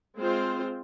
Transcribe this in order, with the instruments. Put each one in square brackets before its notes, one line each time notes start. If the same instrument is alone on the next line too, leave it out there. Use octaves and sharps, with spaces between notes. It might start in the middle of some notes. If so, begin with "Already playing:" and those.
[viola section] G#3 C4 F4 C5